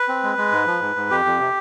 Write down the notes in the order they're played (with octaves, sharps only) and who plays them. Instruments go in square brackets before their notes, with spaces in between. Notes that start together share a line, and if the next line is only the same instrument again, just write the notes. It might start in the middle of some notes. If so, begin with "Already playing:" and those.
Already playing: [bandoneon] B4
C4
G#3
G#3
G#2
F3
G#2
G#2
F2 G4
F2
C3